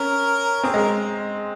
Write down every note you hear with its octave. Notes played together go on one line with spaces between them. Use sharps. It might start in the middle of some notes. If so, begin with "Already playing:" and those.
Already playing: C#4 A#4
C4 G#4
G#3 A#4